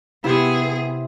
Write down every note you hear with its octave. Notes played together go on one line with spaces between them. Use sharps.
C3 B3 E4 G#4